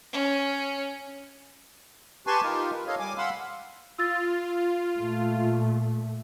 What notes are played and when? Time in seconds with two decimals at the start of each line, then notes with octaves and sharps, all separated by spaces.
0.13 C#4
2.27 G4 B4 G#5 A5 C6 C#6
2.43 D#4 F4 G4 A#4
2.73 B4
2.87 A4 C#5 D#5 F5
2.99 G3 G#5 D6
3.18 F5 F#5 B5 C6 E6
3.98 F4 E6 A6
4.96 A#2 A3